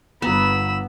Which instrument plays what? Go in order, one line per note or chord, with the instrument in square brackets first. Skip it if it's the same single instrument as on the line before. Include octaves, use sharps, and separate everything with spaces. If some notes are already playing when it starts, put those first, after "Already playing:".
[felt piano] G1 A#5 E7 [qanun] B3 [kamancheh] B5 E6